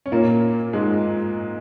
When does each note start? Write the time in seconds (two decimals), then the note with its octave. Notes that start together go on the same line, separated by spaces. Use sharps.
0.06 C#4
0.12 A#2 A#3
0.73 G#2 G#3